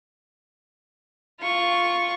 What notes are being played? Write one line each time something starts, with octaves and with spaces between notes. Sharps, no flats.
F4 C#6